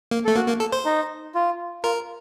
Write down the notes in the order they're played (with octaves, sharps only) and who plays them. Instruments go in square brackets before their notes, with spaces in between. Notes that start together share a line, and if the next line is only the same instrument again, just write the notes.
[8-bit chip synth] A#3
[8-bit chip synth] A3 [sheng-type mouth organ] A4
[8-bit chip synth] A#3 [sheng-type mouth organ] F#4
[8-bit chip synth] A#3
A4
C5
[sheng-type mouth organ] D#4
F4
[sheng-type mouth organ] F4 [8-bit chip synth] A#4